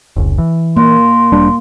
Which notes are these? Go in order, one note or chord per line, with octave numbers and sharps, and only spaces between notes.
F1 C#2
E3
A#3 C6
E1 G3 D4